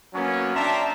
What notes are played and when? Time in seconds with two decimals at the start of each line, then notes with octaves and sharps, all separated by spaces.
0.14 F#3 A#3 B3 C#4
0.55 D4 E5 G5 A5 A#5 C6